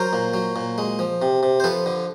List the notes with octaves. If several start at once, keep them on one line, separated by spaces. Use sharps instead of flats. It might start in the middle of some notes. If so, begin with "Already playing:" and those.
Already playing: F#3 A#4 C5
A#2
F#3
A#2
G#3
F3
C3
C3
C5
F3 A4 B4
D3